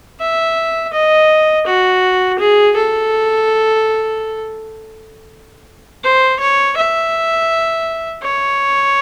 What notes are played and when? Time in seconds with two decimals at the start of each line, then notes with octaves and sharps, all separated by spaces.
0.20 E5
0.93 D#5
1.66 F#4
2.39 G#4
2.76 A4
6.04 C5
6.40 C#5
6.77 E5
8.23 C#5